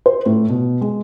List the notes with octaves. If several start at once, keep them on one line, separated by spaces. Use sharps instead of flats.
C5
A2
B2
G#3